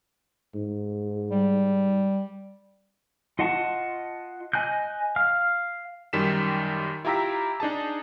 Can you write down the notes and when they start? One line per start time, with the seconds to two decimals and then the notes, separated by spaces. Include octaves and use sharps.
0.55 G#2
1.31 G3
3.39 F4 D#5 F#5 A5 C#6
4.53 D#5 G#5 F#6 G6
5.16 F5 F6
6.13 F#2 D#3 G3 B6 E7
7.05 E4 F4 G4 A#5 E6 B6
7.60 D4 D#4 G#4 A5